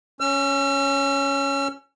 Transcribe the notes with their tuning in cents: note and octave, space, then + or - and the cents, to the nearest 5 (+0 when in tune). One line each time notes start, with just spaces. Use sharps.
C#4 +0 E6 +45